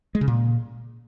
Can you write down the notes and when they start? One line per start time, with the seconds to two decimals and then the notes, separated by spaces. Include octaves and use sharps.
0.15 G#3
0.21 C#3
0.28 A#2